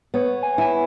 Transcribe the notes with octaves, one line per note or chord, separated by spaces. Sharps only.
B3 C#5
G#5
E4 G#5